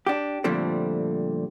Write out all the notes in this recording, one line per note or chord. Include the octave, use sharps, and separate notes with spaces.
D4 G4
A#2 D3 F3 G3 A3 C4